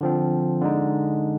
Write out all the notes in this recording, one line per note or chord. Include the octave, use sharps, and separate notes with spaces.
D3 F3 C4
D3 G#3 D#4